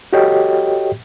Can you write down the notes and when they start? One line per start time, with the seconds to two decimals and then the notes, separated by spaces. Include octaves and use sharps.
0.13 F#4 G4 A4 C#5 D#5 G5